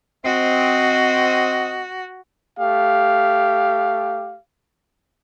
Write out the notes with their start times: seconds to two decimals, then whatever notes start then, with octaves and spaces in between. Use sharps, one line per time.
0.25 C4 F#4 D#5
2.60 A3 G4 F5